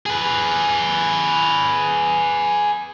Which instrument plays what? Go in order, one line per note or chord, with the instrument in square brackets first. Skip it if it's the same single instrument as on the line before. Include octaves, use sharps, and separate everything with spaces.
[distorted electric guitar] G#4 B4